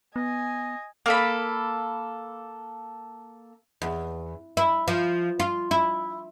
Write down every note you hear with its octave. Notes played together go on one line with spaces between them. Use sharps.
B3 D#5 G#5
A#3 A4 B5
E2
E4
F3
F4
E4